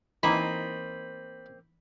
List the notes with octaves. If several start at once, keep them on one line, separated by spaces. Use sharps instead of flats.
E3 A#3 C4 D#4 D#5 B5